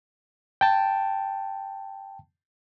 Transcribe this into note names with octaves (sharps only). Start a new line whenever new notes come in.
G5 A5